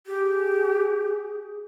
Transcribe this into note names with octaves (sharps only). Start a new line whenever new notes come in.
G4 G#4